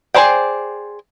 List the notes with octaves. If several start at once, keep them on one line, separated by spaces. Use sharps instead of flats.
G#4 A#4 C5 D5 G5